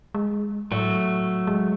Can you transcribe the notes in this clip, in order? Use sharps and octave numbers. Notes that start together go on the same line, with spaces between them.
G#3
A2 F#3 A3
G#3